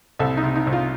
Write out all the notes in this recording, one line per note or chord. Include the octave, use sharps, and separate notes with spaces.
C2 A4
D#4
C3
D#4
C2
F4